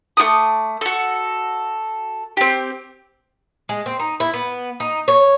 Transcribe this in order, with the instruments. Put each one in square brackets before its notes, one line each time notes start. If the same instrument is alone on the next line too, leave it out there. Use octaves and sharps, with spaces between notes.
[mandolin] A3 F#4 D6 D#6
F#4 A4
C4 G4
[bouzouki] G#3
C4
D#4
E4
B3
D#4
C#5